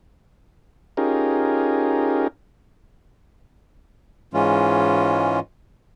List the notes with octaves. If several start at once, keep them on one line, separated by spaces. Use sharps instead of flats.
C#4 D#4 F4 G4 G#4 A#4
G#2 E3 G#3 C#4 F4